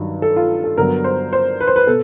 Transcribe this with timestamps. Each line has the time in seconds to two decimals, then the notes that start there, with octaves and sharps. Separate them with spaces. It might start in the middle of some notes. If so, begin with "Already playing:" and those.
Already playing: G2 D#3 F#3
0.22 A4
0.36 F4
0.64 A4
0.77 G2 D3 F#3 B3 A#4
1.04 C5
1.33 C5
1.61 B4
1.67 C5
1.76 B4
1.87 B2 A4